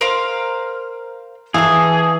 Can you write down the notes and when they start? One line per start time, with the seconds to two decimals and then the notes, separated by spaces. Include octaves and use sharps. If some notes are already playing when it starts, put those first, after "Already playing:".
0.01 A#4 C5 F5
1.54 E3 G#4 F5 A5